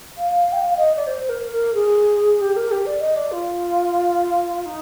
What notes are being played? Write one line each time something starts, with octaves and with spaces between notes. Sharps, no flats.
F5
G5
F5
D#5
D5
C5
A#4
A#4
G#4
G4
A#4
G4
D5
D#5
D5
F4
D#4